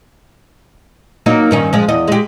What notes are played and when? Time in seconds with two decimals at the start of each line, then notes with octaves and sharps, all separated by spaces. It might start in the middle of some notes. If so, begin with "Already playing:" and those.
1.26 F#3 A#3 D#4
1.51 G2 D#3 C#4
1.73 F3 G#3
1.88 E2 D#5
2.08 G#3 G4